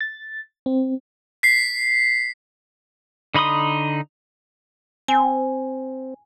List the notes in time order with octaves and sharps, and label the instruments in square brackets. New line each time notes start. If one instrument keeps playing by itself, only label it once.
[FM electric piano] A6
C4
[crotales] B6 C7
[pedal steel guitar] D3 D#4 B5 C6 D#6
[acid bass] C4 [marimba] G#5